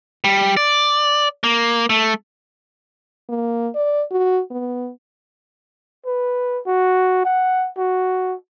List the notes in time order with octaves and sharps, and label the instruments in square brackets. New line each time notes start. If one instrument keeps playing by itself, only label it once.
[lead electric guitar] G3
D5
A#3
A3
[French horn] A#3
D5
F#4
B3
[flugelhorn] B4
F#4
F#5
F#4